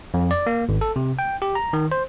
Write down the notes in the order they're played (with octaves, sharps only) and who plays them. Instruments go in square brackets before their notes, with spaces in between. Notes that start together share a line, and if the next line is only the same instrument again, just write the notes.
[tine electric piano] F2
D5
A#3
G#1
A4
C3
G5
G4
A#5
D#3
C5